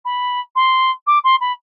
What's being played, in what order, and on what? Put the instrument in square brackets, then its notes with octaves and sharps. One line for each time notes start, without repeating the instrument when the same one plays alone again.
[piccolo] B5
C6
D6
C6
B5